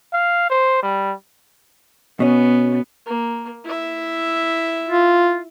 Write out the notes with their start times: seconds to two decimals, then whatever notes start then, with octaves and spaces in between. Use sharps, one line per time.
0.13 F5
0.50 C5
0.83 G3
2.20 B2 B3 C#4
3.06 A#3
3.64 E4 E5
4.89 F4